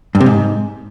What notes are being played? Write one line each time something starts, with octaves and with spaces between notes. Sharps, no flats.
G2
C3
G#2